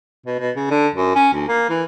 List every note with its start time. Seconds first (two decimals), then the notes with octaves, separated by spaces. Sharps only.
0.26 B2
0.39 B2
0.56 C#3
0.71 D3
0.95 F#2
1.15 C#4
1.34 D2
1.48 A#3
1.69 E3